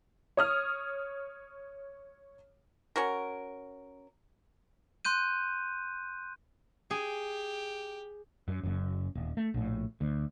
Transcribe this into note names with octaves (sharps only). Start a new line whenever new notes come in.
C#5 D#6 F6
C#4 F#4 A#4
C6 F#6 G6 D#7
G4 G#4
F#2
F#1 F#2
D#1
A3
A#1 A2
D2